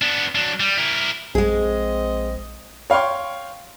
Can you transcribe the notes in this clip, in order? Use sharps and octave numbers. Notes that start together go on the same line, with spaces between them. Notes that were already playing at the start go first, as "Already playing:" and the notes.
B3 D4
F#3 D4
G3
E4 A#4
A#1 G#3 C4 G#4 D#5
C#5 F5 G5 C6 C#6